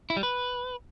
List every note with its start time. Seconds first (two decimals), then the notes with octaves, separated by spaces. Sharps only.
0.10 E4
0.17 G3
0.23 B4